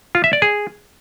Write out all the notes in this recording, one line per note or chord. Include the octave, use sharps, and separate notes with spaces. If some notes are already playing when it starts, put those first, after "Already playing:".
F4
E5
D5
G#4